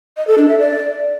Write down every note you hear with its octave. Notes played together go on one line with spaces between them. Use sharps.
D#5
A4
D4
E5
D5